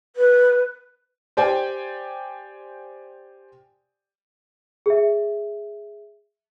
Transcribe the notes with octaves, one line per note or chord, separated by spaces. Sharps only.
B4
G4 C5 D5 G5 G#5
G#4 E5